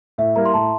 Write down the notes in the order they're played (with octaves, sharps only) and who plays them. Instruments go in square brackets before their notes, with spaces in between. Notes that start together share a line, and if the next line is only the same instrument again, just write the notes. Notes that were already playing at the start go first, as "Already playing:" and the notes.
[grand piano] A2 [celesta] E5
[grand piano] G3 A#3 E4 A#4 [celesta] A#5
[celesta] C6
[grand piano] A2 [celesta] A5